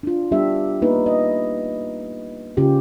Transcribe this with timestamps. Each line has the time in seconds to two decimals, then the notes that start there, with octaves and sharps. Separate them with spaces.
0.03 D4 F4
0.32 G3 B3 D4 G4 E5
0.82 A#3 B3 D#4 B4
1.06 D#5
2.57 C#3 C#4 F4 G4